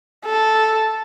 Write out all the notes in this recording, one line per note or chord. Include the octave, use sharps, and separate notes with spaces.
A4